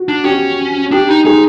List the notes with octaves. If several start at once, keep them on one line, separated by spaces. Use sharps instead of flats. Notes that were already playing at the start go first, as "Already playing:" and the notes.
Already playing: F#4
D4
C#4 G4
D4 G4
D#4
D#4 G#4